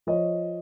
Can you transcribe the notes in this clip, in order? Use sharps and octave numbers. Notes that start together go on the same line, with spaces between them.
F3 C#5 D#5